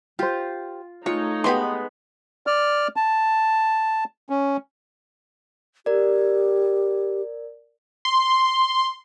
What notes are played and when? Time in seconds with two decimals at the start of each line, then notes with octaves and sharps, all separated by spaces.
0.19 F4 G4 C5
1.06 G#3 A3 D#4 F4 C#5
1.44 G#3 B3 G4 B4 B5 C6
2.47 D5 F6
2.96 A5
4.30 C#4
5.86 G4 A#4 D5
8.05 C6